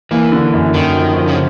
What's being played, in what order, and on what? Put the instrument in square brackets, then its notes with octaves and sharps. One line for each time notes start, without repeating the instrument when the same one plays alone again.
[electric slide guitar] E3 [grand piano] A#3
[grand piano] D3
F#2
[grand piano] F#2 [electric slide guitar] D#3
[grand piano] F3
F3
[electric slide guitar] C#3